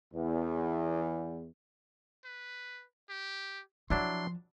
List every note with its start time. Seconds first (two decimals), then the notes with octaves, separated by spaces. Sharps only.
0.13 E2
2.25 B4
3.09 G4
3.90 F3 F#3 D4 E4 C6